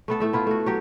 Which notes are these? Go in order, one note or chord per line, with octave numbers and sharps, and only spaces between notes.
A3 B3 A4
A2 A3 E5
B3 E4 F4
A3 F#4
F#3 G4 C#5